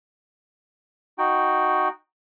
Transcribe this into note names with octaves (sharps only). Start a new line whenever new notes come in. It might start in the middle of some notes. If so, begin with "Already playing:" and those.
D#4 F#4 G5